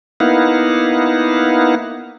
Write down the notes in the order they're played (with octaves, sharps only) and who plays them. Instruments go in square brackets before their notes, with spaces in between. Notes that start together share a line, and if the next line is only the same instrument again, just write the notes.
[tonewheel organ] A#3 B3 D#4 E4 F5 F#5